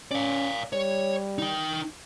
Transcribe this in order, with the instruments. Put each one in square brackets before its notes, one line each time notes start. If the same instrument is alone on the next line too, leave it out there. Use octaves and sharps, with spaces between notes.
[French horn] C#4 [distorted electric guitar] D5 F5
[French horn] G3 [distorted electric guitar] C#5
[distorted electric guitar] D#4 G5